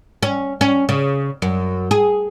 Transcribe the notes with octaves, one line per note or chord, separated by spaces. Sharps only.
C#4
C#4
C#3
F#2
G#4